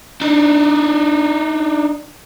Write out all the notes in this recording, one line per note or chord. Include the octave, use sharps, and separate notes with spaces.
D4 D#4